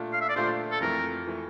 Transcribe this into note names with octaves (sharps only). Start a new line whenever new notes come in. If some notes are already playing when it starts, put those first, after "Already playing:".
Already playing: A#2 A3 D4 F4
F5
E5
D5
A#2 A3 D4 F4 C5
A4
F2 E3 A3 A#4
E3 A3